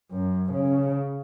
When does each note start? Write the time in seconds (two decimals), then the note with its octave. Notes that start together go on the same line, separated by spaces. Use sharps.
0.11 F#2
0.53 C#3